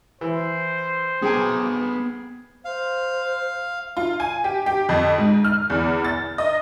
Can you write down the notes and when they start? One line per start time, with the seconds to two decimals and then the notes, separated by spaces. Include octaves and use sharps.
0.21 E3 C5
1.22 B3 G#4 G5 G#5 A#5
2.65 C5 F5
3.97 F4
4.20 G#5
4.44 G4
4.66 G4
4.89 F2
5.18 G#2
5.44 F6
5.70 E2
6.04 A6
6.38 D#5